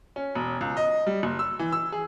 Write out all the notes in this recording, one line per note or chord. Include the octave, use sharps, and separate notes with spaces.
C#4
E1
C#2
D#5
G3
F#1
E6
E3
E6
G#4